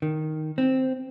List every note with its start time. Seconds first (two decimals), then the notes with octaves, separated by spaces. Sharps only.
0.02 D#3
0.58 C4